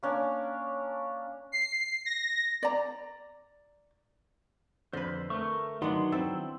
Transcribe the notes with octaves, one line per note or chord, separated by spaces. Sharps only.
A#3 C#4 D4
C7
A#6
D5 A#5
F2 D3 B4 C5
A3 A#4 C#6
D#3 F#3 B3 D4 C6
C4 E4 A4